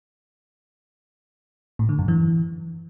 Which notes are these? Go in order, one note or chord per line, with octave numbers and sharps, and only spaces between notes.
A2
D3
F#2
E3